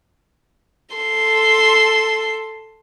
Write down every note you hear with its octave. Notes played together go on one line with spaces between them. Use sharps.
A4 C6